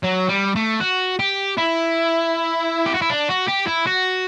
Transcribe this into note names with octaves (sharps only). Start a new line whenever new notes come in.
F#3
G3
A3
F#4
G4
E4
G4
F#4
E4
D4
F#4
G4
E4
F#4